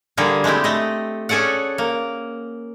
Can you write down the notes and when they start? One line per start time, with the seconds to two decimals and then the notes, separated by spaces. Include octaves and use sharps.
0.17 D3 G3 A#3 G#4
0.44 G#3 A3 C4 E4 G4
0.64 A3 D#5
1.29 C#4 G#4 A4 D5 F#5
1.78 A#3